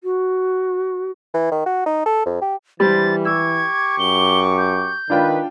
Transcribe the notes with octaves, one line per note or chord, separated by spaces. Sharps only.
F#4
E3
D#3
F#4
D#4
A4
F2
G4
E3 G3 D4 B4 C5 A6
G4 C#6 D6 E6 G#6
F#2 G7
G6
D#3 D4 F4 B4 G5